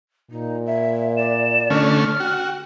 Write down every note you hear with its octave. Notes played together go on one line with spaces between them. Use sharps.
A#2 D#4
E5
D5 E7
D3 A3 C#4 F6
F#4 G5